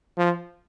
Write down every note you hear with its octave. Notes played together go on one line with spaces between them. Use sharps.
F3